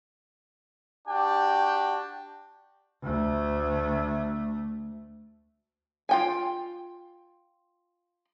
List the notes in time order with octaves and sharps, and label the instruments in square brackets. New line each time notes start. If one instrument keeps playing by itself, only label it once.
[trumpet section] D4 F#4 G4 G5
[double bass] D2 A3
[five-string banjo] F4 G5 G#5